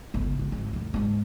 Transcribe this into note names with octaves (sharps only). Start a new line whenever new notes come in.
G1 C#2
G#1
G#1
F#2 A2
G#2 G#3